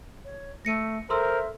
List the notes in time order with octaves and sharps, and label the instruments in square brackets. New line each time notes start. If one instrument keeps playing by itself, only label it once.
[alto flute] C#5
[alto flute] A3 [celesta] A#6 C#7 D#7
[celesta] A4 C6 E6 [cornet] A#4 [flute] C5 [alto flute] E5